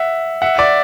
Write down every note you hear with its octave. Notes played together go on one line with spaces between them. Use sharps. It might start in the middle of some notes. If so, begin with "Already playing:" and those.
Already playing: E5 F#5
E5 F#5
D5 E5